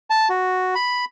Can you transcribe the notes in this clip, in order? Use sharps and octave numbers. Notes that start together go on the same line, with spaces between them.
A5
F#4
B5